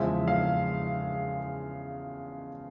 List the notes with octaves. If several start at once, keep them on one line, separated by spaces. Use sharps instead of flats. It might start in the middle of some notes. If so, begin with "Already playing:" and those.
Already playing: E2 C#3 F3 G#3 E5
F5